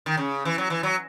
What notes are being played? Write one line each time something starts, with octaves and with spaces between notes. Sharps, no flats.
D#3
C#3
E3
F#3
E3
F#3